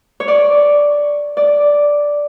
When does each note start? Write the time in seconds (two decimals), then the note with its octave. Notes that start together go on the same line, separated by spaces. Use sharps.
0.20 C#5
0.28 D5
1.37 D5